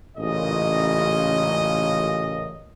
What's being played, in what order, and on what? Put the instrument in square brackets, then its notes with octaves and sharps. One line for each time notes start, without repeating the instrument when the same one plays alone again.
[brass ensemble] A1 A#2 C#3 D#5